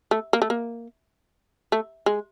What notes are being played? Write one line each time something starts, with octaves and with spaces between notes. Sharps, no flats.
A3
A#3
A3
A#3
A3
G#3